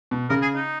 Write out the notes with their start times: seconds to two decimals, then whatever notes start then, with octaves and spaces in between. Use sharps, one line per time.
0.11 B2
0.29 C#3 A#4
0.41 G#4
0.55 D#4